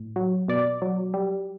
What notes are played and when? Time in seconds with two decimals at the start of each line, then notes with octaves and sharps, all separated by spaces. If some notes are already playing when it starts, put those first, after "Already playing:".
Already playing: A2
0.16 F#3
0.48 B2 D5
0.82 F#3
1.14 G3